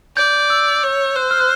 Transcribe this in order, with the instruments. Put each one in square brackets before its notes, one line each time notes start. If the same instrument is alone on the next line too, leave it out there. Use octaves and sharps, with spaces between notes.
[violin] D5 [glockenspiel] G6
[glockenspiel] E6
[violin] C#5
[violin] C5 [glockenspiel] F#6
[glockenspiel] F6
F#6